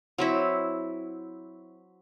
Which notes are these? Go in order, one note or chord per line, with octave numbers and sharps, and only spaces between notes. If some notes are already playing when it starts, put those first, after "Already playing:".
F#3 C4 E4